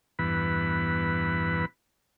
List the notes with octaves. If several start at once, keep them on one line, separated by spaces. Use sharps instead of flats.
E2 G2 E3 B3 B4 B5